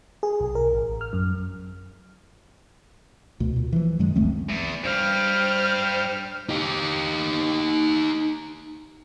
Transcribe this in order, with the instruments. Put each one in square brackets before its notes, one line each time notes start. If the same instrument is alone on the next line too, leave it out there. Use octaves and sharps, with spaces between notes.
[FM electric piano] G#4
B1
A#4
A1
F6
F#2
[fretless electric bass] D2 B2
A#2
E3 F3
F#2 D#3 F#3 G#3
G1 C#2 A3 C4
[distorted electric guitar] E2
[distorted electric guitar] G2 G3 [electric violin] C5 F6
[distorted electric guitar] D#4 G4